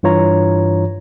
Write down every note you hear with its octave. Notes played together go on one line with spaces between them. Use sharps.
G2 E3 F4 C#5 A#5